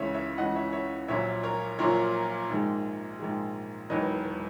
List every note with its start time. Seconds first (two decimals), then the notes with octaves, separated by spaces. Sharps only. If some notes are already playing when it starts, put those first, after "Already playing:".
Already playing: C#2 C#3 E3 C#5 E5
0.14 C#5 E5
0.38 C#2 C#3 E3 D#5 F#5
0.51 F#5
0.55 C#5 E5
0.73 C#5 E5
1.08 A#1 A#2 F#3 C#5 E5
1.43 A#4 C#5
1.79 A#1 A#2 F#3 A#4 C#5
2.49 A#1 G#2 D#3 G#3
3.19 A#1 G#2 D#3 G#3
3.90 E1 E2 D#3 F#3 B4 D#5